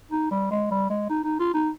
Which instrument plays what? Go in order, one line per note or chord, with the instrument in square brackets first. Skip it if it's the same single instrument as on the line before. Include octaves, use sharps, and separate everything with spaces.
[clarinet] D#4
G3
G#3
G3
G#3
D#4
D#4
F4
D#4